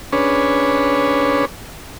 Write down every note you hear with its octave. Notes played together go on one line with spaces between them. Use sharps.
C#4 D4 G#4 B4 C#5